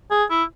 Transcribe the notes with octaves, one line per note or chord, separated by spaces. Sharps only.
G#4
E4